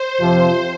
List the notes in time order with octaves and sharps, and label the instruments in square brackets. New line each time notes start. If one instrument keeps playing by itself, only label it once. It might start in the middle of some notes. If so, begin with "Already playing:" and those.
Already playing: [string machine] C5
[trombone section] F2 C3 F3